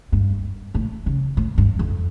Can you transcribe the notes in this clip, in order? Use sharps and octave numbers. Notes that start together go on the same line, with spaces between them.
G2
A2
C#3
A2
G2
F2